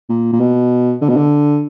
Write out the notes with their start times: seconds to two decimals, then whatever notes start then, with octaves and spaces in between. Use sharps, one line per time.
0.09 A#2
0.32 A#2
0.40 B2
1.01 D3
1.09 B2
1.16 D3